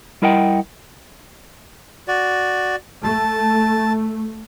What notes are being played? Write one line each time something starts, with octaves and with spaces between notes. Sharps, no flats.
G3 E4 A#4 D#5 F#5 G5
F#4 D5
A3 A5